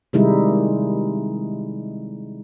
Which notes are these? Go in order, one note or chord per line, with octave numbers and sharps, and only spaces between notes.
C3 D#3 G3 G#3 D#4 E4